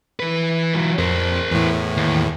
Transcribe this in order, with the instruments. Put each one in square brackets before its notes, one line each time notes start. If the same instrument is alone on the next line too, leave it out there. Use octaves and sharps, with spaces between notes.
[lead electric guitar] E3 B4
E3 F#3
[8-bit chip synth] F2 [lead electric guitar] A#4 C5
[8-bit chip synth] E2 A2
[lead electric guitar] D#2